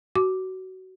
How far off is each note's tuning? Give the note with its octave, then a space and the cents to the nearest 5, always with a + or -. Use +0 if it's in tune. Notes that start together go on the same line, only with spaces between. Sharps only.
F#4 +20 D6 +0